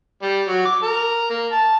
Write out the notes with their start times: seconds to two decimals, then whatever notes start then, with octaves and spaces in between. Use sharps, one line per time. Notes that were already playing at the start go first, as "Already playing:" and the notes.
0.23 G3
0.49 F#3
0.66 D6
0.83 A#4
1.30 A#3
1.52 A5